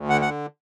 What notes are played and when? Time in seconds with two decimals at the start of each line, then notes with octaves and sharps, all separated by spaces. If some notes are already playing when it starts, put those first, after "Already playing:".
Already playing: D2
0.09 D3 F#5
0.21 F#5
0.25 D3